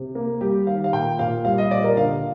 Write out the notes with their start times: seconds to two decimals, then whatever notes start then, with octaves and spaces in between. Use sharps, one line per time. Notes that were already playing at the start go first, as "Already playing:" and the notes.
Already playing: C3
0.15 A#3
0.41 G3 G4
0.66 D#3 F5
0.84 F5
0.92 A#2 G5
1.19 A#2 F5
1.45 G3 F5
1.58 D#5
1.71 A#2 D5
1.84 A#4
1.97 D3 F5